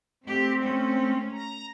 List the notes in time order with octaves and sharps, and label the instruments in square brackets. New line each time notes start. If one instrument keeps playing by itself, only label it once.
[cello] A3 G4 [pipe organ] C4
[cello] A3 C#4
[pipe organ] A#5